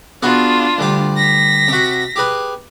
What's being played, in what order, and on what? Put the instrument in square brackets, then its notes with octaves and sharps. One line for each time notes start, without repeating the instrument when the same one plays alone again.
[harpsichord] B3 F#4 G#4 [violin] D4 F4
[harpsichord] D2 G3 G4
[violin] A#6 B6
[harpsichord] C3 F#4
G4 G#4 B4